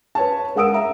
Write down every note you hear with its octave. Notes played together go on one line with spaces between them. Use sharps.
B4 C#5 A5
G#3 A#4 F#5 D#6 E6 D7
E5 A#5